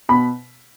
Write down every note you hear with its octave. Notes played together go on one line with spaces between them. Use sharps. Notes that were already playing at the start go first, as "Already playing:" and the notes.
B2 B5